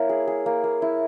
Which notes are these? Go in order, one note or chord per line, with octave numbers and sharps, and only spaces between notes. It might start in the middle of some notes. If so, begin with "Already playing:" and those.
Already playing: A#3 E4 C#5
G#4
G#4
A#3
A#3
E4